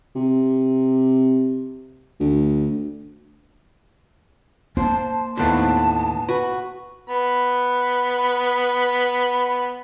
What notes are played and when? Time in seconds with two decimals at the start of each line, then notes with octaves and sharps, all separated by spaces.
0.15 C3
2.20 D2
4.77 A#3 C5 A5
5.37 D#2 A2 B3 B4 C5 A5
6.29 F#4 B4
7.08 B3 B5